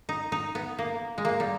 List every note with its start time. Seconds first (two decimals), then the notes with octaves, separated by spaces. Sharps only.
0.09 D#4
0.32 D#4
0.55 B3
0.79 A#3
1.18 G#3
1.25 A#3
1.40 G3